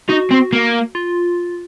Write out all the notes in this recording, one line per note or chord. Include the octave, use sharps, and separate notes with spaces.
D#4 F#4
C4
A#3
F4